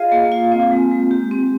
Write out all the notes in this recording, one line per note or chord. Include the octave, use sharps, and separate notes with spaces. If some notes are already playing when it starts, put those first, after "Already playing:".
Already playing: F4 G#4 D#5 F5
A#3
F4
C4
G#3
G#3
G4
C4